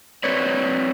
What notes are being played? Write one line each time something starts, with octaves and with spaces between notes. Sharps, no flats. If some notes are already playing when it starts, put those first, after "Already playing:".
F#3 C4 B4 C#5 D5